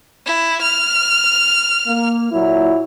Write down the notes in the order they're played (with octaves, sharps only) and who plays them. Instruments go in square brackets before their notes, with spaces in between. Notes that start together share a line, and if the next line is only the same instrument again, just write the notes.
[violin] E4
F6
[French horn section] A#3
A#2 F#3 E4